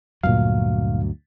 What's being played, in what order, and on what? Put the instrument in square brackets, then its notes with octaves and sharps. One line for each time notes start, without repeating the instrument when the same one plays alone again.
[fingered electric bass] D2 G2 F#3 [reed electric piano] A#2 F5